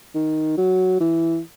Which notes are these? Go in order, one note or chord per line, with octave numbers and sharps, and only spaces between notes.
D#3
F#3
E3